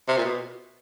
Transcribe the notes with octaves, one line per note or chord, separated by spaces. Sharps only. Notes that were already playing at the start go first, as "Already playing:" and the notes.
C3
A#2
B2